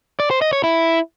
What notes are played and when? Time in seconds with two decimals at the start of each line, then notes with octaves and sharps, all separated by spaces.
0.20 D5
0.31 C5
0.42 D#5
0.53 C#5
0.64 E4